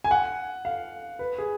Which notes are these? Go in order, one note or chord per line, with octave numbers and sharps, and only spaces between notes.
G#5
F#5
F5
B4
G#4